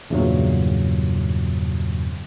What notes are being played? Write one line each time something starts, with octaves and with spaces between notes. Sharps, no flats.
E2 G2 A#2 C#3 F#3